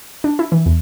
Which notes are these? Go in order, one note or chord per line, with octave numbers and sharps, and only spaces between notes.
D4
E4
E3
E2